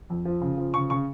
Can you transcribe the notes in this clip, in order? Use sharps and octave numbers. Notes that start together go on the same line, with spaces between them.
F2
F3
C#3
F3
C#3 C#6
C#3 C#6